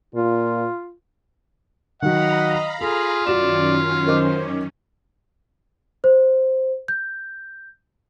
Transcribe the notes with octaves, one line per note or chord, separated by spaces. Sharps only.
A#2 F4
D#3 F#3 D#5 F5 F#5 A#5 B5
F4 G#4 A4
F#2 D#3 C#4 F#4 D5 E7
A#4 C5 D#5 D6
C5
G6